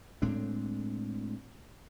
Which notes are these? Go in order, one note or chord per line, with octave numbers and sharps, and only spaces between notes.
A2 G#3 C4 D4